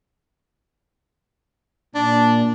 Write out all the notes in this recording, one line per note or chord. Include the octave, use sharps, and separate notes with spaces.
A#2 D4